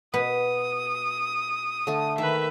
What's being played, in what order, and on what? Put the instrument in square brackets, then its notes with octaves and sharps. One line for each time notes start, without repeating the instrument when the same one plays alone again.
[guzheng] B2 B3 B4 [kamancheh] D#6
[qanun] D3 A3
[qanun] D#3 [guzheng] A#3 [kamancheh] B4 E5